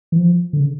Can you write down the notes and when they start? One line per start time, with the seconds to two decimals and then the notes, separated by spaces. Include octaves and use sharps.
0.12 E3
0.18 F3
0.53 D3
0.60 C#3